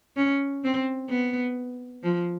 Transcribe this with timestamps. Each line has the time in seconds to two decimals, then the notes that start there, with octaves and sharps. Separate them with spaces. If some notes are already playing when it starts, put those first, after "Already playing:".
0.16 C#4
0.64 C4
1.09 B3
2.03 F3